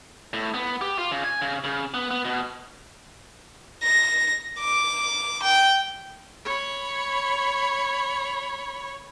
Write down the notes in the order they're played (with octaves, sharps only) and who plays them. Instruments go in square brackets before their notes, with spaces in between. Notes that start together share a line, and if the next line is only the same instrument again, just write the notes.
[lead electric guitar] A2
B3
G4
F4
C#3
G#5
C#3
C#3
B3
B3
B2
[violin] A#6
D6
G5
[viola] C#5 B5